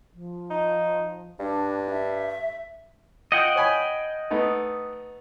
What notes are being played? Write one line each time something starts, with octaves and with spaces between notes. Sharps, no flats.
F3
D#4
G2 D4
E5
F4 D#5 F#5 G5
C#5 G#5 B5
A3 B3 D#4